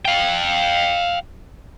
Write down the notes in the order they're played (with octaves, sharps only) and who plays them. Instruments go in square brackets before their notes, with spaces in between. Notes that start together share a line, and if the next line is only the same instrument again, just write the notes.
[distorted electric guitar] F5 G5